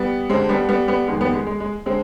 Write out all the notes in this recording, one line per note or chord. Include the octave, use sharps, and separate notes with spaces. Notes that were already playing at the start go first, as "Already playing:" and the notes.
Already playing: G3 B3
D2 D3 G3 G#3 C4
G3 B3
G3 B3
G3 B3
F2 D#3 G3 G#3
G3 B3
G#3
G#3
G#3
D3 G#3 C4